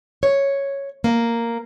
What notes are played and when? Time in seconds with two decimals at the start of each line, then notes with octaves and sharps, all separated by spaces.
0.23 C#5
1.04 A#3